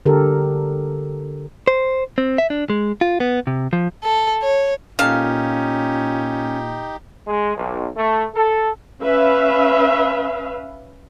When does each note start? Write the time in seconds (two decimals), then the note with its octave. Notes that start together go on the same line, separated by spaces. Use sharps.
0.06 D3 G4 A4 A#4
1.68 C5
2.18 C4
2.38 E5
2.50 D4
2.70 G#3
3.01 F4
3.20 B3
3.47 C3
3.73 F3
4.04 A4
4.42 C#5
4.99 A#2 C#4 D#4 G4 A4 F5
7.26 G#3
7.57 B1
7.97 A3
8.35 A4
9.02 C#4 B4 E5 F5